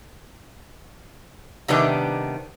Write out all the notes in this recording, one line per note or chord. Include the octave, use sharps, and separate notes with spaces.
C3 D#3 G3 B3 D4 D#4